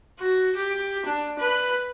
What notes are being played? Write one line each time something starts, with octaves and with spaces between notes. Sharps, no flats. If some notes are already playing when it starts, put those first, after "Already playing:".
F#4
G4
D4
B4 B5